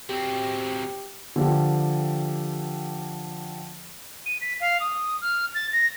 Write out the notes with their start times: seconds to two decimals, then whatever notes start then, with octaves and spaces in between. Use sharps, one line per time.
0.09 F#3 C4 G4
1.36 D3 F3 G4
4.26 D#7
4.41 B6
4.60 F5
4.80 D#6
5.21 F6
5.55 A6
5.72 A#6